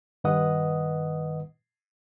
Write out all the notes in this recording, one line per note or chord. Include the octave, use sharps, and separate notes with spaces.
G2 D#3 B4 D#5 F#5 D#6